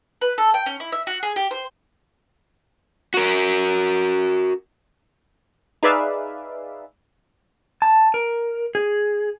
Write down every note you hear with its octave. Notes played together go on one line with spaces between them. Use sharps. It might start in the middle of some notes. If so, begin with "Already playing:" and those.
B4
A4
G5
C#4
E4
E5
F#4
G#4
G4
C5
F#4 A#4
D#4 G#4 B4 D5 E5 F5
A5
A#4
G#4